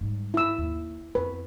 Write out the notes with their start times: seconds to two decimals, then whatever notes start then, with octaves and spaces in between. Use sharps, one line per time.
0.01 G#2 G3
0.34 E4 E6
0.58 D#2
1.15 F2 B4